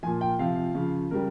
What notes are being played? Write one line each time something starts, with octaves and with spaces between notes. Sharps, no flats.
A#2 F3 G#5
G5
C3 F3 F5
C#3 F3
C#3 G3 A#4